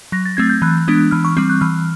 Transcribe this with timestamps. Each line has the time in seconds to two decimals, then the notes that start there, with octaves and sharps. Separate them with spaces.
0.12 F#3 A#6
0.25 A6
0.37 A3 C4 G#6
0.49 G6
0.62 E3 F#6
0.88 G#3 B3 D4
1.11 E3 F6
1.25 C#6
1.37 G3 C4
1.50 F#6
1.61 E3 F6